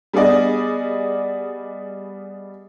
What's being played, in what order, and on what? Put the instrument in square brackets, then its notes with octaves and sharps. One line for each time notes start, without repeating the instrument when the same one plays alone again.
[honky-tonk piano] G3 B3 G#4 D5 D#5